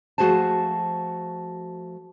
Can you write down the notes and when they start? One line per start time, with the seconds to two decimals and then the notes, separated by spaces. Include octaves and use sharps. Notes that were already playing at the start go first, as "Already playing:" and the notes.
0.18 F3 A3 F#4 G#4 C5 A5